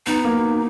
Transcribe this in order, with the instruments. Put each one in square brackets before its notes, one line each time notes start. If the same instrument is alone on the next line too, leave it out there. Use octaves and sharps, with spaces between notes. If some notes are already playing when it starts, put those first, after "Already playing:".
[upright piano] B3 [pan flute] D#4
[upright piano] A#3